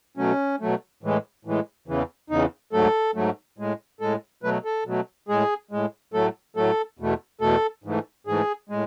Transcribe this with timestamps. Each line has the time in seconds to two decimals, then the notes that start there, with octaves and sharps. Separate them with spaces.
0.17 B2 F#3 A3 C#4
0.60 B2 F#3 A3
1.03 A2 E3 G#3
1.45 A2 E3 G#3
1.88 E2 C#3 E3
2.30 E2 C#3 E3 D#4
2.73 G#2 F#3 A3 A4
3.15 G#2 F#3 A3
3.58 A2 G#3
4.00 A2 G#3 A4
4.43 B2 F#3 A3 B4
4.65 A4
4.86 B2 F#3 A3
5.28 A2 G#3 G#4
5.71 A2 G#3
6.13 A2 F#3 A3 A4
6.56 A2 F#3 A3 A4
6.99 E2 B2 A3
7.41 E2 B2 A3 A4
7.84 G#2 E3 A3
8.27 G#2 E3 A3 G#4
8.69 A2 G#3